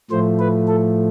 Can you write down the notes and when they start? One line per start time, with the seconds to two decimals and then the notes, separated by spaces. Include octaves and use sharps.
0.11 A2 F3 A3 C5
0.39 B4
0.67 A4